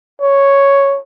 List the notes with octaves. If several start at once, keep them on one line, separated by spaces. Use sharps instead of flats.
C#5